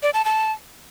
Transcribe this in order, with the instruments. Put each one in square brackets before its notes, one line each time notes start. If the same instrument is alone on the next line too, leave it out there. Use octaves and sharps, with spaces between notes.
[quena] D5
A5
A5